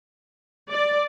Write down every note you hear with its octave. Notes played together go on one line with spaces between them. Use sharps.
D5